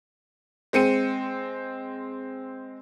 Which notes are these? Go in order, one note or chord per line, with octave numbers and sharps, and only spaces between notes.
G#3 C4 C#7 D#7